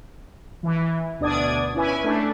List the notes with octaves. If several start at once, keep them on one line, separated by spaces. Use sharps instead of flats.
E3
D2 B2 D4 D5 D#6 G#6
C#4 E4 B4 G#5
A3 D4